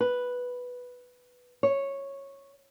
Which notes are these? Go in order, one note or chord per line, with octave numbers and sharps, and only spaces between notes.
B4
C#5